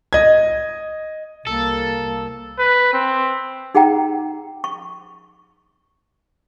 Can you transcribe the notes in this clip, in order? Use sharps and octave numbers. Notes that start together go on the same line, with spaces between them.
D#5 G#6
C2 A#3 A4
B4
C4
D#4 G#4 F#5 G5 A#5
C#6